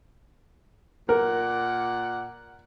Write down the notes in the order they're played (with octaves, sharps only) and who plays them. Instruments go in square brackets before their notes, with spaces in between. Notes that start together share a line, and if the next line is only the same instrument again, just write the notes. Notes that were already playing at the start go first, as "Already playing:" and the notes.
[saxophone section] A#2 D5 F#5 [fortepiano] A#4